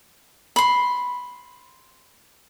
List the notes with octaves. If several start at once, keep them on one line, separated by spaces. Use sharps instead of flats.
B5 C6